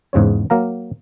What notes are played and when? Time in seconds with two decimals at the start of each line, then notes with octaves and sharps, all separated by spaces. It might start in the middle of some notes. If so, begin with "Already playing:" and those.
0.13 E2 G#2 C#3 C4 C#5
0.50 F#3 A#3 F5 A#5